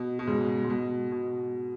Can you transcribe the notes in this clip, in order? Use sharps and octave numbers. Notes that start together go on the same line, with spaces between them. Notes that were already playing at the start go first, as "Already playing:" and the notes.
Already playing: B2
B2
G#2 C#3
G#2
B2
B2